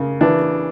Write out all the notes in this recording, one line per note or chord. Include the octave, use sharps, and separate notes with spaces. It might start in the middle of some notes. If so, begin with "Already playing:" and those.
Already playing: C#3 A#3
E3 D4